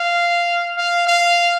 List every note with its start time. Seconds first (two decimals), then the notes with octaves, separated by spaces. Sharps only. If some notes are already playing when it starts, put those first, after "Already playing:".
Already playing: F5
0.77 F5
1.07 F5